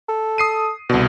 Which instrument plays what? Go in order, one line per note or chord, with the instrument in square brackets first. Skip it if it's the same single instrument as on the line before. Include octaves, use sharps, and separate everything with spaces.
[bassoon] A4
[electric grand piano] D#6 C7 D#7
[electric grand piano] C2 B2 [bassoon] D3